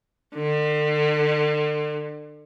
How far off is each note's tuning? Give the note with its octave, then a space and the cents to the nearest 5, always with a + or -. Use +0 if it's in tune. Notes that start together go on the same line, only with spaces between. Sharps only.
D3 +40